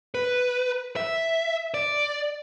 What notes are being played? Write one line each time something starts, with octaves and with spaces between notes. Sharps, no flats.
B4
E5
D5